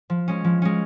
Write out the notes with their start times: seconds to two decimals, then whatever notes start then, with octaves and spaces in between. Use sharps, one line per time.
0.10 F3
0.28 G#3 C#4
0.44 F3
0.62 G#3 C#4